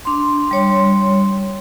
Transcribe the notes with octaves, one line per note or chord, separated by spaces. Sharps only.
D4 C6
G3 C#5 C6